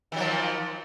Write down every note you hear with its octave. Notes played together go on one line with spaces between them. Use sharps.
D#3 F3 F#3